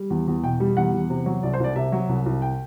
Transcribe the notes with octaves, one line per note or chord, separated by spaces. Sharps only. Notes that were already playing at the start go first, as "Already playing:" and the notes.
Already playing: G3
E2
E2
B2 G5
G3
E2 F#5
E2
C3
F#3
C2 D5
C5
C2 D5
C3 E5
F#3
C2
C2
G5